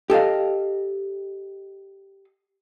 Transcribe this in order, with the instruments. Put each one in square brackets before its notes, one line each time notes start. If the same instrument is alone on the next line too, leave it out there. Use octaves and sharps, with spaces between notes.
[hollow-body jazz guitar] G4 A4 D#5 F5